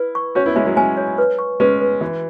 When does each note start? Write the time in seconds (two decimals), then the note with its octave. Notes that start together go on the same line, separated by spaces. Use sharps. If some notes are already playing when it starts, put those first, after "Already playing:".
Already playing: E4 B4
0.15 C#6
0.35 C#4 F#4 C#5
0.46 B3 E4
0.56 G#3 C#4 E5
0.66 F#3 B3
0.76 G#3 C#4 G#5
0.97 C#5
1.18 B4
1.39 C#6
1.60 G#3 C#4 B4
1.81 B4
2.01 E3 F#4